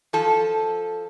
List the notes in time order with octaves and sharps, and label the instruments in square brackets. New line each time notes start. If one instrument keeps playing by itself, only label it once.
[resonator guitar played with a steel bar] F3 A4